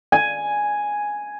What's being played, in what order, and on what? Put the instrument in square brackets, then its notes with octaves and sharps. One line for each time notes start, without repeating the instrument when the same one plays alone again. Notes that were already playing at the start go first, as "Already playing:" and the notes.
[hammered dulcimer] G#5